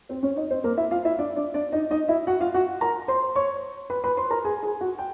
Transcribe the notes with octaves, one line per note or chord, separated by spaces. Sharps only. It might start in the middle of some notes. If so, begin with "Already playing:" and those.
C4 C5
C#4 C#5
D#4 D#5
C4 C5
A#3 A#4
E4 E5
F4 F5
E4 E5
D4 D5
D4 D5
D4 D5
D#4 D#5
D#4 D#5
E4 E5
F#4 F#5
F4 F5
F#4 F#5
A#4 A#5
C5 C6
C#5 C#6
B4 B5
B4 B5
C5 C6
A#4 A#5
G#4 G#5
G#4 G#5
F#4 F#5
G5